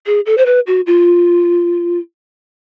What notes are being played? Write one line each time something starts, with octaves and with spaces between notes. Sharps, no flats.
G#4
A4
C5
B4
F#4
F4